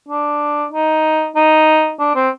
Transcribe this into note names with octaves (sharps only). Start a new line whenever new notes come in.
D4
D#4
D#4
D4
C4